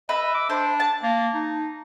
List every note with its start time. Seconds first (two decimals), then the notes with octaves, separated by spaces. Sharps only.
0.09 B4 D#5 E5
0.34 D6
0.49 D4 C5
0.80 A5
1.03 A#3
1.34 D#4